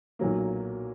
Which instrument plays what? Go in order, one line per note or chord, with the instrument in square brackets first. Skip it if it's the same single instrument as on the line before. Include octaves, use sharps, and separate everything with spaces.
[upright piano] B1 A#2 F#3 A#3